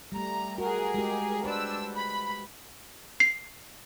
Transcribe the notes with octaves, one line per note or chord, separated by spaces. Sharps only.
G3 A3 A#5
F#4 G#4 A#4
G#3 G4
D4 B4 C5 E6
B5
C7